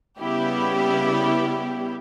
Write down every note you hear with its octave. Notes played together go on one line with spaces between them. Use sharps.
C#3 G3 B3 E4 G4